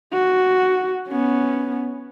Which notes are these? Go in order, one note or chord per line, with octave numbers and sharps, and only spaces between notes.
F#4
B3 C#4